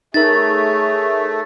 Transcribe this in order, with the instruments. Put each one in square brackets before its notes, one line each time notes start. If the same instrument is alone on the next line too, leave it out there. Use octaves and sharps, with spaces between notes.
[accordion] A3 [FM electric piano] D#4 A#4 [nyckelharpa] G#4 C#5 [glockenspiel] A6